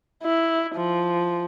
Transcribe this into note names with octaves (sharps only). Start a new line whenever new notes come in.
E4
F3